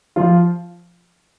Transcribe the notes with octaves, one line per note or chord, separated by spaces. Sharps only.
F3 F4